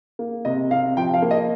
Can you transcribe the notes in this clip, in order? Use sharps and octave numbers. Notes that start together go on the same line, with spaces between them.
A#3
C3 D#5
C3 F5
F3 G5
F5
A#3
D#5